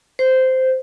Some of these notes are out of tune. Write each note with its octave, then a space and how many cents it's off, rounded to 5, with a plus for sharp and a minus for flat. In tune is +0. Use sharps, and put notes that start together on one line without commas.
C5 -10